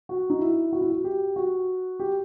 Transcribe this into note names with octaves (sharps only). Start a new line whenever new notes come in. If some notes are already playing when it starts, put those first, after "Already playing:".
F#4
D#4
E4
F#4
E4
F#4
G4
F#4
G4